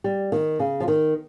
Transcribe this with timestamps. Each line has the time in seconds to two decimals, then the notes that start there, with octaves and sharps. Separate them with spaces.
0.04 G3
0.32 D#3
0.59 C#3
0.80 F3
0.88 D#3